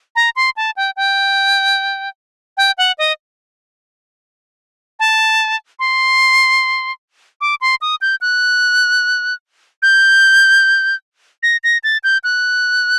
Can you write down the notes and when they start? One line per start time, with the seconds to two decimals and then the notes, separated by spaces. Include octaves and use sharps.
0.16 A#5
0.36 C6
0.57 A5
0.77 G5
0.96 G5
2.57 G5
2.78 F#5
2.98 D#5
5.00 A5
5.79 C6
7.41 D6
7.61 C6
7.81 D#6
8.01 G6
8.21 F#6
9.82 G6
11.43 A#6
11.64 A#6
11.84 A6
12.04 G6
12.24 F#6